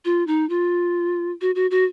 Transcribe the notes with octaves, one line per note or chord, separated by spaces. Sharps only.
F4
D#4
F4
F#4
F#4
F#4